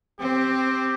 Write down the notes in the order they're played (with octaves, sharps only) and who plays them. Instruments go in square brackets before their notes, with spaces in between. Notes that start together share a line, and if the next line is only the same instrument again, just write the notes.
[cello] C4 [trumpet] G4